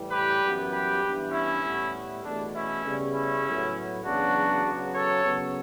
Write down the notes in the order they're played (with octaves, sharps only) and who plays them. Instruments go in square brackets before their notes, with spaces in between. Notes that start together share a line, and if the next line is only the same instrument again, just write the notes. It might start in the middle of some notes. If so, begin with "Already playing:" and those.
Already playing: [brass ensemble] A2 E3 G3
G4 B4
F#2 E3 G3 B3
G4 B4
G2 E3 B3
C#4 E4
A2 G3 B3
E2 B2 A3 D4
C#4 E4
C#3 G3 B3
C#4 E4
A2 F#3 B3
E2 C#3 F#3 B3 D4 F#4
C#3 F#3 B3
A4 C#5
C#3 F#3 B3